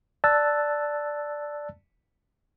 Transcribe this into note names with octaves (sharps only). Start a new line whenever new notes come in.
D5 A5 E6 F#6 A6